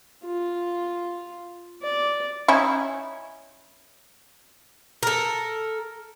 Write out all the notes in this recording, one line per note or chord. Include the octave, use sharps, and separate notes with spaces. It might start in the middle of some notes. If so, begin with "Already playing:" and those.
F4
D5
C#4 D#4 E4
A4 A#4